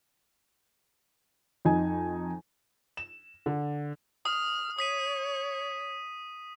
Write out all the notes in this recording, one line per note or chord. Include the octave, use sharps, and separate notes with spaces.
F2 D#4 G#5
E7
D3
D#6 F6
C#5 D#6 B6 D#7